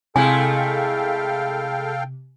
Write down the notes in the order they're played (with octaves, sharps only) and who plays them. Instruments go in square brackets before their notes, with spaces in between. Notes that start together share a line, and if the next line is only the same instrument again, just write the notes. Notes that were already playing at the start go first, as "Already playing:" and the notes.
[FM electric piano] C3 [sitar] G#3 A3 E4 [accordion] A4 F5 G5 [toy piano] G#5